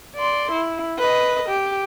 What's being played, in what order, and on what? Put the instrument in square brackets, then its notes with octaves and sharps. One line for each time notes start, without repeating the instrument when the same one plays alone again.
[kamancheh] D5 C6
E4
B4 D#5
G4